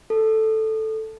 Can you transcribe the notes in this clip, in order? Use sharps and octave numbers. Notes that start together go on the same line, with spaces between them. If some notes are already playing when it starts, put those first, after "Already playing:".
A4